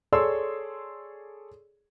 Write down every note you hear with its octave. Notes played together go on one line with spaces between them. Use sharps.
G#4 A4 C#5 D5 C6 E6